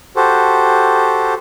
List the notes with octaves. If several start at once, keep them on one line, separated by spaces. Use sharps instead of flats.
F#4 G4 A4 C5